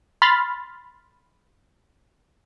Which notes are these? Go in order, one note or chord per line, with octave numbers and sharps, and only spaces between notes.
B5 C6 F6 A6